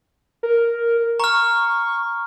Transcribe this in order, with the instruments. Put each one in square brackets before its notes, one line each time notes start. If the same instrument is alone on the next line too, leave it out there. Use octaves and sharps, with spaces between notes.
[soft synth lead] A#4
[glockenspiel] A#5 F6 [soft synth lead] C#6